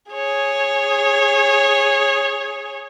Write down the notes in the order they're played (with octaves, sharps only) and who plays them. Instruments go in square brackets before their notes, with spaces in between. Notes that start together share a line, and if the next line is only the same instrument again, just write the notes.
[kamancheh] G#4 C#5